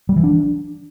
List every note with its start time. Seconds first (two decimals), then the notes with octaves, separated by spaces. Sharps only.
0.09 G3
0.16 E3
0.23 D4